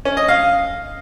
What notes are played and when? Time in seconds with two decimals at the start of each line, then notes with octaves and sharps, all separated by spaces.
0.05 C#4
0.17 D#5
0.28 F5